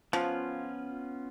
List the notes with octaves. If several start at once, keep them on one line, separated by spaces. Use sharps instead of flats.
F3 B3 C#4 F4